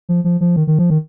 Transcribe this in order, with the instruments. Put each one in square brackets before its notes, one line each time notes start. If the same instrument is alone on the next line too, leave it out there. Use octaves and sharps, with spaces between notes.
[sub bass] F3
F3
F3
D#3
D#3
F3
D#3